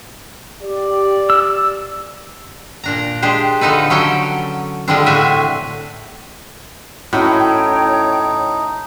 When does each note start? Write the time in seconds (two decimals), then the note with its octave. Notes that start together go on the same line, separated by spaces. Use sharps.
0.63 G4 D5
1.30 E6
2.84 A#2 D4 A#5
3.22 G#3 D4 G4 C5
3.61 D3 F3 D#4 A4 B4
3.90 D3 F#3 C#4 A4 G5 A5
4.88 D3 F3 G3 G#3 C4 D4
5.06 A2 F#4 E5 G#5
7.13 A2 C#4 D#4 E4 F#4 C#5 G5